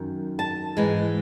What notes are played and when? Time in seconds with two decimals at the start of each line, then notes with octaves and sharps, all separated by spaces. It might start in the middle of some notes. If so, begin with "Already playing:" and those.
Already playing: F#2 D#3
0.39 A5
0.77 G#2 E3 G#3